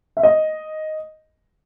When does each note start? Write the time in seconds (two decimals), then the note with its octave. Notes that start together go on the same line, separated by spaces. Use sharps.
0.17 E5
0.23 D#5